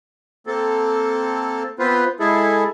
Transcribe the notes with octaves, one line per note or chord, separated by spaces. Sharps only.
A#3 C4 A4
B3 C4 F4 B4 C5
G#3 E4 G#4 A4